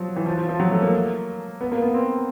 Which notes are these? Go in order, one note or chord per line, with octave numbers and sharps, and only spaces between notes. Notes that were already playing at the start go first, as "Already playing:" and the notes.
Already playing: F3 F#3
E3
F3
F3
F3
F#3
A3
A#3
B3
A#3
B3
C4